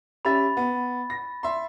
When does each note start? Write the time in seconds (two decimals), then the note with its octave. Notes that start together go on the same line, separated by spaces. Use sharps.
0.25 C#4 G4 E5 B5 A6
0.57 B3
1.10 A#6
1.43 E5 C6